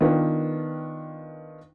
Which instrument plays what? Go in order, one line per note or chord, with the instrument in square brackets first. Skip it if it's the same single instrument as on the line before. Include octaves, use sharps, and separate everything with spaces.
[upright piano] D#3 B3 D4 F4 A#4 B4